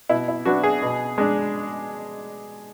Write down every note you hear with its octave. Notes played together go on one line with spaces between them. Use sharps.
B2 E4
E4
F#3 B3 D4 F#4
G#4
B2
G#3 D4